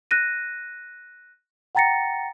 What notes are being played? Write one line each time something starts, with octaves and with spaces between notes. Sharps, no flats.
F#6 A#6 D#7
F#5 G5 A#5 A6 A#6 C#7